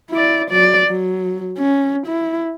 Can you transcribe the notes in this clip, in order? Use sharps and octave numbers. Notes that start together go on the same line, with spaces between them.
E4 D5
F#3 D5
F#3
C#4
E4